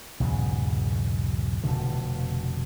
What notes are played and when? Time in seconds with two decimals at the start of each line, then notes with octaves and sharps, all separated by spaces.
0.20 B1 E2 G#2 C#3
1.64 F1 B2 D3